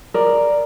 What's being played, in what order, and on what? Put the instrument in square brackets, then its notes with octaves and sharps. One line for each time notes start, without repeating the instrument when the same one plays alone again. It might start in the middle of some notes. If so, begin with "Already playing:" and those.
[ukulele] A#4 D5